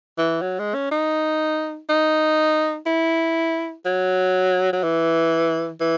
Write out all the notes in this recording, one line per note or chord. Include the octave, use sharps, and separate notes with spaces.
E3
F#3
G#3
C#4
D#4
D#4
E4
F#3
F#3
E3
E3